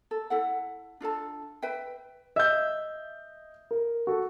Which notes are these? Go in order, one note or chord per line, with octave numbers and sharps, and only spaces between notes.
A4
E4 A4 F#5
D4 F4 A4 A5
B4 E5 G5
D#5 E5 G6
A#4
F#4 A4